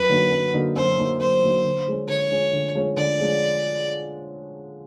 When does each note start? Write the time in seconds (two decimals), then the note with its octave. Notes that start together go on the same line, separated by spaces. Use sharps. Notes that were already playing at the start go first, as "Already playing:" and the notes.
Already playing: F#2 B4
0.09 D3 F#3 A#3 D#4
0.32 F#2
0.54 D3 F#3 A#3 D#4
0.76 F#2 C5
0.98 D3 F#3 A#3 D#4
1.20 F#2 C5
1.42 D3 F#3 A#3 D#4
1.64 D3
1.87 F3 G#3 C#4
2.08 D3 C#5
2.30 F3 G#3 C#4
2.53 D3
2.75 F3 G#3 C#4
2.97 D3 D5
3.19 F3 G#3 C#4